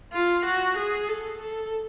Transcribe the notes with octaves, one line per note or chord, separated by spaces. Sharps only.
F4
F#4
G#4
A4
A4